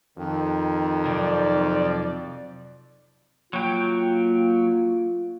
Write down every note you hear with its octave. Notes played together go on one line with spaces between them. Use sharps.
F2 D#3
C3 F#3 D#4 D5
F#3 A#3 F4 G5